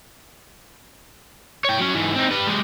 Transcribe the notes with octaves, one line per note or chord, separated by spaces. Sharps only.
C#5 G5
F#3 C#4
G#2 E3
C4 D#4
G3 B4
G#3 G4